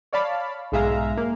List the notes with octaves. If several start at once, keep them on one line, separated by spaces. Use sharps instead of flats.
C#5 D5 F5 A5 B5
B1 G#2 G#3 E5 F5 A#5
A#3